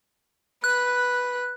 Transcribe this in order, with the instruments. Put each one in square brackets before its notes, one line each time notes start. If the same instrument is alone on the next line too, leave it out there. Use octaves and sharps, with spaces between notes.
[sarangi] B4 [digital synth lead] F#6